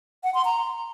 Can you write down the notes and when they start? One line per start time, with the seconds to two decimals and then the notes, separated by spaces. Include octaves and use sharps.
0.24 F#5
0.34 C6
0.45 A#5